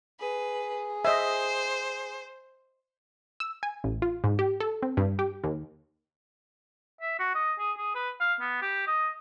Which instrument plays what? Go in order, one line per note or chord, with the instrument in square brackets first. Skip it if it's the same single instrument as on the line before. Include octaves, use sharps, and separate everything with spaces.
[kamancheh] G#4 [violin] B4
[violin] C5 [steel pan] D#5 E5
[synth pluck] E6
G#5
A1
F4
G#2
G4
A4
C4
G2
G4
D#2
[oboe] E5
F#4
D#5
G#4
G#4
B4
F5
B3
G4
D#5